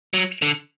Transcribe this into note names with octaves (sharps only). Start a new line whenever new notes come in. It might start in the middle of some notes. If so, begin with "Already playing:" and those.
F#3
D3